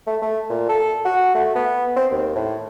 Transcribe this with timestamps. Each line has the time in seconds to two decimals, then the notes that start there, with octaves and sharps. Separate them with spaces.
0.07 A3
0.22 A3
0.50 A#2
0.69 A4
1.05 F#4
1.35 A3
1.55 B3
1.96 C4
2.11 D#2
2.36 A2